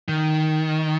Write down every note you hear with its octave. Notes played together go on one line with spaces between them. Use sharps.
D#3